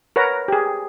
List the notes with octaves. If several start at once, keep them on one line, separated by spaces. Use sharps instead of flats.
A#4 B4 C#5 F#5 A#5
G4 G#4